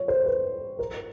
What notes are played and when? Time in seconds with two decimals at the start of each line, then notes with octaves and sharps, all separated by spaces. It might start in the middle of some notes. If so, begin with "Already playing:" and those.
Already playing: C#5
0.08 C5
0.26 B4
0.79 A#4